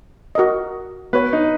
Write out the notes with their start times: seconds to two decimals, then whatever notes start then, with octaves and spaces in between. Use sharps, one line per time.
0.35 F#4 A#4 D#5
1.13 B3 F#4 B4 C#5
1.33 D#4